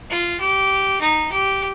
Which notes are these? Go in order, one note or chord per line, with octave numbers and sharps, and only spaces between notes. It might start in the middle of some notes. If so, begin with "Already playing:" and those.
F4
G4
D#4
G4